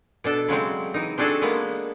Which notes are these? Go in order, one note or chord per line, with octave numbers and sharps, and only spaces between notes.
B2 D4 A4
C#3 F#3 G#3 C4
E3 D#4
C4 D4 F#4 G#4 A4
G#3 A#3 B3 B4